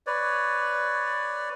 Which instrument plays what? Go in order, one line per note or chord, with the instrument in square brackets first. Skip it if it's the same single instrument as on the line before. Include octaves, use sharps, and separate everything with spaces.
[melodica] B4 C#5 D5